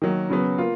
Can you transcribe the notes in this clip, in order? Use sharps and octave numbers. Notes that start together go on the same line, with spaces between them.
D#3 F#3 A#3
C#3 F#3 B3
A#3 F4